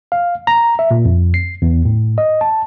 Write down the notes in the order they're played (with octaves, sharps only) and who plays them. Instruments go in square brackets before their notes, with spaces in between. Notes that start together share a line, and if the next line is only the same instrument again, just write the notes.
[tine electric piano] F5
A#5
E5
A#2
F2
C7
E2
A2
D#5
A5